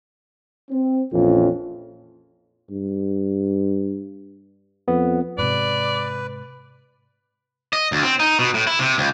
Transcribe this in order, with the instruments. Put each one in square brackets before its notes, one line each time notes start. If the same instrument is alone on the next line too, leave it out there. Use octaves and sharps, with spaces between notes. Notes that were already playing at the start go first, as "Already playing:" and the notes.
[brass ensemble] C4
A#1 F2 E3 C#4 F4
[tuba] G2
[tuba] F2 [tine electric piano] B3
[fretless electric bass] G#2 C3 [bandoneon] B4 [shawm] D5
[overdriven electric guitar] D#5
D2
C4
D#4
B2
A2
E4
C3
C#2